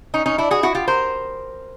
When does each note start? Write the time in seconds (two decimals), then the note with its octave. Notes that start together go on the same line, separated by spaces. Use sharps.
0.14 C#4 D#4
0.26 C#4 D#4
0.38 D4 E4
0.51 F#4 G#4
0.63 E4 F#4
0.75 F4 G4
0.88 A#4 C5